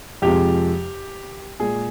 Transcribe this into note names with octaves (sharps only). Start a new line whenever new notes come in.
F2 C3 F3 G#3 G4
A#2 G#3 G#4